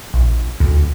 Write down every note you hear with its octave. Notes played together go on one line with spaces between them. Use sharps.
A#1
D2